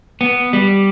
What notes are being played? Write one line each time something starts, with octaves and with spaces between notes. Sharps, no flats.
B3
G3